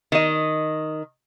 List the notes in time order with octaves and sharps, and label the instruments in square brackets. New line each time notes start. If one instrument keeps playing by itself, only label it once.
[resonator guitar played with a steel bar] D#3 D#5